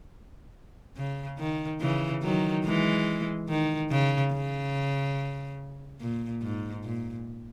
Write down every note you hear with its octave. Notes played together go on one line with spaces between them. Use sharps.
C#3
D#3
C#3 E3
D#3 F#3
E3 G#3
D#3
C#3
C#3
A#2
G#2
A#2